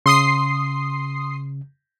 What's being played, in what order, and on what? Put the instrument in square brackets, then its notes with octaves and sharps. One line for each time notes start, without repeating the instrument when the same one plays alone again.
[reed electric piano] C#3 [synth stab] C6 D#6 C7